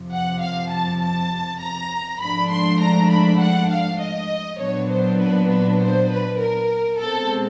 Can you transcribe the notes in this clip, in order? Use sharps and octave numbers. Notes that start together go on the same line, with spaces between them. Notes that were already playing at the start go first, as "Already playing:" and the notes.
Already playing: F2 C3 F3
F#5
F5
A5
A5
A#5
G#2 F3 A3 D4 B5
C6
A#5
B5
F#5
F5
D#5
A#2 F#3 B3 D4 C#5
C5
B4
B4
C5
B4
A#4
B2 G#3 C4 A4